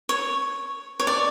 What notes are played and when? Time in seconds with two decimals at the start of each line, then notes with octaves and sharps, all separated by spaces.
0.09 C#5
1.00 C#5
1.07 D5